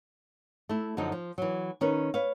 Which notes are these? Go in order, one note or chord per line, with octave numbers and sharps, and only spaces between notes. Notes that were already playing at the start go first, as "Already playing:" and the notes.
A3 E4
F#2 D3 F3 F#3 D#4
F3
E3 F#3
D#3 C#4 A#4 B4
B4 C#5 F5